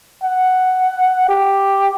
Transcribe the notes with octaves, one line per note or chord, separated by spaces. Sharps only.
F#5
G4